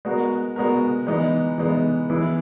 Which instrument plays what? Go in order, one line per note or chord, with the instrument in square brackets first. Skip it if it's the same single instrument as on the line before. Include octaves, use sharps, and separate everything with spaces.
[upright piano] G#3 B3 F#4 A#4
G#3 B3 F#4 A#4
E3 G#3 B3 D#4
E3 G#3 B3 D#4
E3 B3 E4 G#4